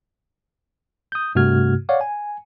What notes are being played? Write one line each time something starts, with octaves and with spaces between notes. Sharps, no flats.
D#6 G6
G2 C3 A3 F#4 F6 G#6
C#5 D5 F5 F#5
G#5